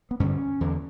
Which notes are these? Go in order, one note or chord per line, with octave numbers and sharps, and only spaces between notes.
B3
G2 D3 C#4
E2 D3